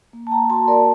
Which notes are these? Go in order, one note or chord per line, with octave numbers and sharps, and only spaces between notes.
A#3
A5
G5 A#5
F#4 A5 C6
A#4 D5